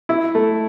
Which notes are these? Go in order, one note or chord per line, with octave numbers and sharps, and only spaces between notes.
E4
A3